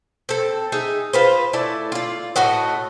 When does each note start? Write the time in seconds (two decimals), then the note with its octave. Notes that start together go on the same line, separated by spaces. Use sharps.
0.29 C4 A4
0.72 D#4 G#4 E5
1.13 F4 B4 C5
1.53 A3 E4 D5 A5
1.92 F4 D5
2.36 A2 A3 F#4 D#5